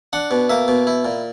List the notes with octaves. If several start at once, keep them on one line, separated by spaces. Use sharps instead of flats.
D4 F#5
B2
A#3 E5
B2
E4
A#2